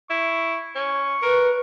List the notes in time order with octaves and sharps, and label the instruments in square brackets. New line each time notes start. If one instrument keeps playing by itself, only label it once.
[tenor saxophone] E4 [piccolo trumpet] C#6
[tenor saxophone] C#4 [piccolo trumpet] C#6
[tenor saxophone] A#4 [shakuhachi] B4